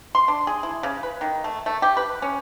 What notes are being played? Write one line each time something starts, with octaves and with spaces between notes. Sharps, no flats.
C6
D4
G#4
E4
C#3
B4
D#3
A3
A3
G4
B4
C#4